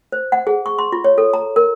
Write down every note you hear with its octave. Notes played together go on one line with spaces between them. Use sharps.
C5
F#5
G#4
C#6
C6
F4
C#5
A4
A#5
A#4